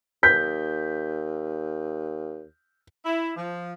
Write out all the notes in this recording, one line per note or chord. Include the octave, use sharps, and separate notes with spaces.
D#2 G6 B6
E4
F3